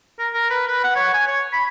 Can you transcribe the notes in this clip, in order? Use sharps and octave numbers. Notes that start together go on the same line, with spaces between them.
A#4
A#4
B4
B4
F#5
C#5
G#5
C#5
B5